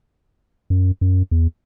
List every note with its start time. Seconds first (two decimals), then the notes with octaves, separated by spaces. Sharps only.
0.70 F#2
1.01 F#2
1.31 E2